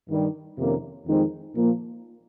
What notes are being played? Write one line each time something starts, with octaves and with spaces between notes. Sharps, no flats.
G2 D#3 G3
F2 C3 D#3 A#3 C#4
F2 D#3 G#3 C4 D#4
A#2 F3 A#3